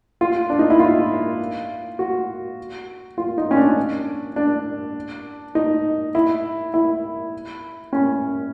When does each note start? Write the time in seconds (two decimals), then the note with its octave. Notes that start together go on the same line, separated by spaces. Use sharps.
0.21 F4
0.50 D4
0.59 D#4
0.70 E4
0.79 F4
1.99 F#4
3.18 F4
3.38 D#4
3.51 C#4
3.57 D4
4.36 D4
5.55 D#4
6.15 E4
6.74 E4
7.93 C#4